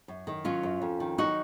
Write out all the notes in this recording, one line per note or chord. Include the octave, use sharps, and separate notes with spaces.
F#2
D#3
F#3 C#4 F4
F#2
F2
D#3
F#3 D#4 F#4